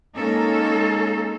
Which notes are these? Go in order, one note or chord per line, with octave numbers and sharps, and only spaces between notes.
G#3 A#3 C#4 D#4 A4